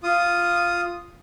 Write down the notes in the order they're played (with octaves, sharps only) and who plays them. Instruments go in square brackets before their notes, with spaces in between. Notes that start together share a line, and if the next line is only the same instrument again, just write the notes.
[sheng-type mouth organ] F4 D#6